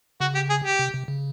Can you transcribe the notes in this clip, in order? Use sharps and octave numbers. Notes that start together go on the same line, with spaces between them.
C#3 F#4
G4
G#4
G4
C3
C3
C#3